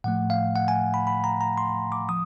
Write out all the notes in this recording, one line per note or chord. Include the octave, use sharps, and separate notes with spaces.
A2 F3 A3 F#5
F5
F#5
G#5
B5
B5
A#5
A#5
C6
D6
F3 D#6